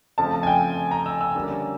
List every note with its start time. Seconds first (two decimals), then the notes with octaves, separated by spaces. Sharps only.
0.18 C#3 F3 A3 C4 A5
0.43 G#5
0.47 G5
0.91 A#5
1.06 E6
1.21 E6
1.35 D3 G3 A#3 C#4